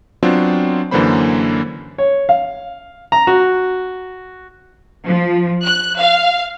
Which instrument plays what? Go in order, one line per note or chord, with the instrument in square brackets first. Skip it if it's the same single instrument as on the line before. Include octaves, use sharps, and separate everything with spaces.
[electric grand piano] F#3 B3 C4 D4 F4
F#2 D3 E3 A#3 C5 B5
[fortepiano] C#5
F5
A#5
F#4
[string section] F3
F#6
F5